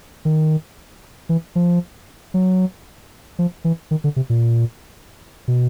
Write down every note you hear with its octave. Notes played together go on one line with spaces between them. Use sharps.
D#3
E3
F3
F#3
F3
E3
D#3
D3
C3
A#2
B2